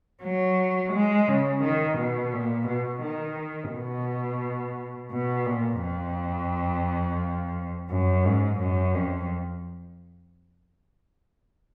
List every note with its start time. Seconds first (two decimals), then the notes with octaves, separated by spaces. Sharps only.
0.23 F#3
0.93 G#3
1.28 C#3
1.63 D#3
1.98 B2
2.32 A#2
2.68 B2
3.02 D#3
3.72 B2
5.11 B2
5.46 A#2
5.81 F2
7.90 F#2
8.25 G#2
8.60 F#2
8.94 F2